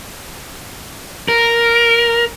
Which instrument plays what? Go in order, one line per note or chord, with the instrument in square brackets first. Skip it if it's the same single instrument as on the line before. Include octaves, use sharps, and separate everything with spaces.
[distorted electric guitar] A#4